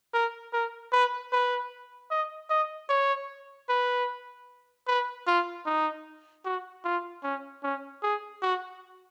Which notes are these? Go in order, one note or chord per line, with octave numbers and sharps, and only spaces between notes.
A#4
A#4
B4
B4
D#5
D#5
C#5
B4
B4
F4
D#4
F#4
F4
C#4
C#4
G#4
F#4